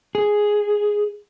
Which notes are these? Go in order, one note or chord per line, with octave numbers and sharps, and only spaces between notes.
G#4